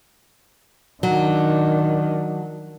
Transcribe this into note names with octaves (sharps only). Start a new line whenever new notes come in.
D#3 F#3 D4